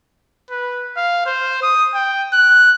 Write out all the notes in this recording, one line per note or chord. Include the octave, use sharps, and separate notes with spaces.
B4
F5
C5
D#6
G5
F#6